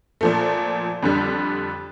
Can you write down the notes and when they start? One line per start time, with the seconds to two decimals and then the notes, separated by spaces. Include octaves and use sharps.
0.21 A#2 F3 A3
1.03 F2 D3 G3